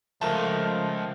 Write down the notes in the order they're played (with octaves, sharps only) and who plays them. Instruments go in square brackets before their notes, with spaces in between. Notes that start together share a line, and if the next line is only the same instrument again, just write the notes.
[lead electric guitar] C#2 [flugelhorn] F3 [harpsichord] A3 [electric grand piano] A#4 A5